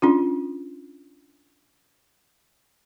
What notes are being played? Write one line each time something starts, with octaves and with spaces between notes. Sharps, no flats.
C#4 D4 F4